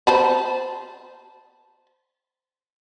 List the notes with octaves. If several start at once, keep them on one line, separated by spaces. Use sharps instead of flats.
C5 A5 B5